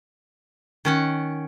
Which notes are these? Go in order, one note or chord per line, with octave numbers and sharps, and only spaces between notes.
D#3 C#4 F#5